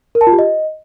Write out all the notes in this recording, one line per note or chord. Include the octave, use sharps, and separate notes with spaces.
A#4
A5
F4
G4
D#5